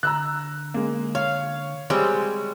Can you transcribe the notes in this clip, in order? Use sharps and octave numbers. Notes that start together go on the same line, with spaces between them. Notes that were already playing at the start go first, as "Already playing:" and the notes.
D3 A#5 E6 F#6
G#3 A#3
C#5 F5
G3 G#3 C4 C#5